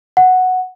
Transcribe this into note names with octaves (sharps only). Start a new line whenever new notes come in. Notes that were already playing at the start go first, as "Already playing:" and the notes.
F#5